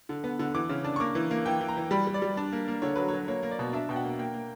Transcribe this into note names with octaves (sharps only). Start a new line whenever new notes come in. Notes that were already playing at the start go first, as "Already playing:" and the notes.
D3
B3
D3
E3 D6
C#3
D4
C#6
A#3 D6
E3
A#3
E3 G5
E3
A#5
E3
G3 B5
G3
D5
G3
D4
A#3
A#3
D3 C#5
F#3 B4
F#3 C#5
A#3 C#5
A#3
D5
B2
D4 E5
B2 G5
F#5
A#3
A#3 G5
A#3